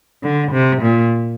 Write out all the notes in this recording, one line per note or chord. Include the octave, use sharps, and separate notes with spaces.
D3
C3
A#2